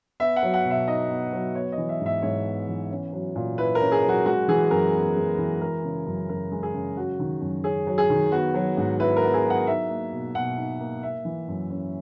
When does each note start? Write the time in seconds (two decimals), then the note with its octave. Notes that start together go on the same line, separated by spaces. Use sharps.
0.20 B3 E5
0.36 F#5
0.43 F#3
0.54 F#5
0.65 B2
0.71 E5
0.87 D#4 D#5
1.10 B3
1.33 F#3
1.55 B3 C#5
1.72 D#5
1.78 E3
1.89 E5
2.01 G#2
2.06 E5
2.22 G#2 C#5
2.45 B3
2.68 E3
2.91 C#4
3.13 F#3
3.36 A#2
3.58 E4 B4
3.75 A#4
3.81 C#4
3.92 G#4
4.03 F#3
4.09 F#4
4.26 G#3 F#4
4.48 E3 G#4
4.71 F#2 A#4
4.93 B3
5.16 G#3
5.38 E3
5.61 G#3 A#4
5.84 C#3
6.06 F#2
6.29 F#2 A#4
6.52 G#3
6.63 G#4
6.74 C#3
6.97 F#3 F#4
7.20 D#3
7.41 F#2
7.64 C#4 G#4
7.87 F#3
7.98 G#4
8.10 D#3
8.32 B3 F#4
8.54 F#3
8.77 G#2
9.00 E4 B4
9.17 A#4
9.23 B3
9.34 G#4
9.45 F#3
9.50 F#5
9.67 D#4 E5
9.90 A#3
10.12 B2
10.35 B2 F#5
10.58 D#4
10.80 A#3
11.03 A#3 E5
11.25 E3
11.48 F#2
11.70 C#4